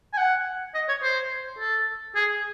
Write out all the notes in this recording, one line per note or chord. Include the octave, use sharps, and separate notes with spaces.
G#5
F#5
D#5
C#5
C5
A4
G#4